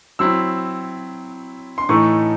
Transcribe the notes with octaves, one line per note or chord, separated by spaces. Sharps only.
F#3 C4 E4 E6
C6
A2 E3 A3 D#4 C#6